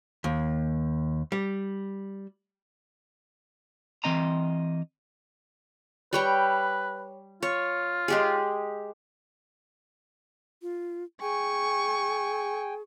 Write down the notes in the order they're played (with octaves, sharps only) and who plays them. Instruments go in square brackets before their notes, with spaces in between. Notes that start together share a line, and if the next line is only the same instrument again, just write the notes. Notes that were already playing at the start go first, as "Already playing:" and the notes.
[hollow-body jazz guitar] D#2
G3
[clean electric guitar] E3 C4 D#5 A#5
[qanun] G3 C#5 G5 [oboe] B4
[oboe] F4 [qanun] C#5
[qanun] G#3 G4 G#4
[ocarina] F4
[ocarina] G#4 [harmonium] G5 G#5 [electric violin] C#6